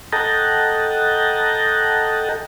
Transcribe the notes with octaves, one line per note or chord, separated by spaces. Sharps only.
A4 D#5 F#5 G5 A5 A#5